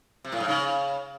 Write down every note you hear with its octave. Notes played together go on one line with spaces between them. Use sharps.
C3
A2
G#2
C#3